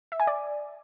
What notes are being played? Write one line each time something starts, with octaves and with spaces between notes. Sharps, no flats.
E5
G#5
D5